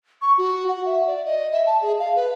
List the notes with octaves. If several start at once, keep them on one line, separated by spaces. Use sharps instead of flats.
C#6
F#4
F#5
E5
D5
D#5
E5
A5
G#4
F5
B4